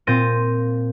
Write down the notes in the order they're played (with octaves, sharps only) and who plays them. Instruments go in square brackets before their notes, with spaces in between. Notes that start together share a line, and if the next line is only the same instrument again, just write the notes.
[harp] A#2 C4 G6 A6 A#6 D#7